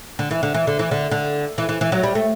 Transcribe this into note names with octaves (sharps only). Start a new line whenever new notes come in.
D3
E3
D3
E3
D3
E3
D3
D3
E3
E3
E3
F#3
G3
A3